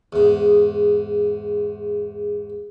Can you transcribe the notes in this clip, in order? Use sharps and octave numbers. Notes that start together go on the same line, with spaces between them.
E2 G#2